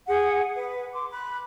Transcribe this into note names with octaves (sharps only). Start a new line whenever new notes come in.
G#4 F#5
B4
C6 D6
B5 F#6